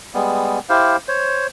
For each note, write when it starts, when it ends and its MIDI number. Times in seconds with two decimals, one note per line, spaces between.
0.14 0.59 55
0.14 0.59 56
0.14 0.59 59
0.69 0.97 64
0.69 0.97 67
0.69 0.97 72
0.69 0.97 77
1.08 1.47 72
1.08 1.47 73